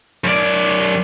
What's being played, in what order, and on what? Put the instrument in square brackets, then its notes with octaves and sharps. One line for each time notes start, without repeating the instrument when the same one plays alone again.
[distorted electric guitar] F#2 D5